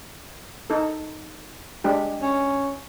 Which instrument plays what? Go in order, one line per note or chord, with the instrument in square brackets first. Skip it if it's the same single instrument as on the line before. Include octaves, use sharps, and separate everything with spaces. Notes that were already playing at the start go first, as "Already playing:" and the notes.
[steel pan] D#4 A4
G#3 D4 G4
[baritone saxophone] C#4